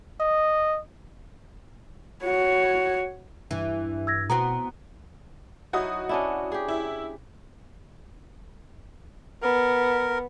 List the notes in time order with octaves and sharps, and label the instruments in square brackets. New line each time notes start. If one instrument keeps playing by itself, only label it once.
[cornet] D#5
[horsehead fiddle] F#4 C#5
[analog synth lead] G2 [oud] E3
[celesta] E6 G#6 A#6
[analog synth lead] B2 [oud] B3 C4 F#4 [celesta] A#5
[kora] F#3 D#4 E4 [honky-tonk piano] F#4 D#6
[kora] C#4 D4 E4
G4 G#4
[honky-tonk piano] E4
[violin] B3 [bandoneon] A#4